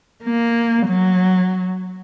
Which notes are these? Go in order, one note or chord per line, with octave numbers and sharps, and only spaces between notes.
A#3
F#3